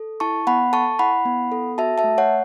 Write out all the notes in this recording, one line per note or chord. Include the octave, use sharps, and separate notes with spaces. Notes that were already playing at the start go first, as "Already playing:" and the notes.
Already playing: A4
E4 A5 C#6
B3 F#5 B5
A4 A5 C#6
E4 F#5 B5
B3
A4
F#4 E5 A5
E5 A5
A3
C#5 F#5